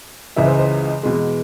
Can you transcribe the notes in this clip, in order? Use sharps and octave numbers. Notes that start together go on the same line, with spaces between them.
C#2 C#3 E3 G#3 E5
C5
C5
E2 B2 G#3